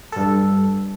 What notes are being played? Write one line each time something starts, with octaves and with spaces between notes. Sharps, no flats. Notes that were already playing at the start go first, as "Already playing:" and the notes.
G2 A4